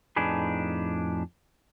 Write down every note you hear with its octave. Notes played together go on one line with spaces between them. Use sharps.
F2 A2 D4 D#4 G#4 B4